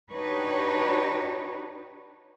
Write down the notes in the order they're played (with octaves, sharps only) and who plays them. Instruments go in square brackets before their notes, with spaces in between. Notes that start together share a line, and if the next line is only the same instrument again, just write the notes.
[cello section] D4 D#4 F#4 G4 B4 C#5